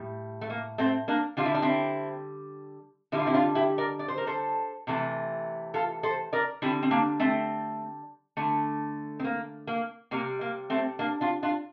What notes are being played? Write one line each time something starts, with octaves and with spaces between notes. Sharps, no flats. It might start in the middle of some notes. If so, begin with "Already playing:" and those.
Already playing: A2 G3
A3
A#3
A3 C4
A#3 D4
D3 G3 F4
E4
D4
C4 E4
D3 G3 E4
F4
C4 E4
D4 F4
E4 G4
A#4 D5
D5
C5
A#4
A4 C5
C3 E3 A3
F4 A4
A4 C5
A#4 D5
D3 G3 C4 E4
C4
A#3 D4
A3 C4
D3 A3
C4
A#3
A#3
C3 G3 A#3
A#3
A3 C4
A#3 D4
D4 F4
D4 F4